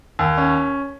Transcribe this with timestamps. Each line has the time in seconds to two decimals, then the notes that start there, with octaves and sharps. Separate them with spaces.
0.19 D#2
0.38 C#4